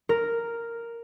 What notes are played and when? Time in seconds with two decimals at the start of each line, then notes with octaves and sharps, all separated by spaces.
0.09 A#4